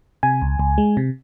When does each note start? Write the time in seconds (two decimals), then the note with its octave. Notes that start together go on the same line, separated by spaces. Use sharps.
0.23 C3 G#5
0.42 C#2
0.59 C#2
0.78 G#3
0.97 C3